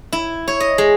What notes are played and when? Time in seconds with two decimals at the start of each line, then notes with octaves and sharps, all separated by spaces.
0.13 E4
0.48 C#5
0.60 D#5
0.78 G#3